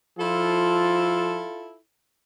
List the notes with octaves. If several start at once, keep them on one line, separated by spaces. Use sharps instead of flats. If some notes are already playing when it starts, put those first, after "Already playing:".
F3 E4 F4 A4